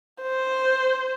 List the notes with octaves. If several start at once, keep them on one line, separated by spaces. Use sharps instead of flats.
C5